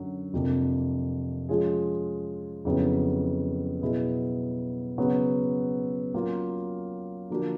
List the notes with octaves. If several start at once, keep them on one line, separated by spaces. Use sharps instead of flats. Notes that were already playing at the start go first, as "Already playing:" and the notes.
Already playing: F#2 D3 F#3
F2 C3 F3 A#3 D4
F3 G#3 C#4 F4 G#4
F2 C#3 F#3 B3 E4
B2 F#3 B3 E4 G#4
C#3 F#3 B3
F#3 A#3 C#4 F4
D3 F3 A#3 D4 F#4